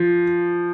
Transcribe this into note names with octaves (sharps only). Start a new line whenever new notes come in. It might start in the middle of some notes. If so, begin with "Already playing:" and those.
Already playing: F3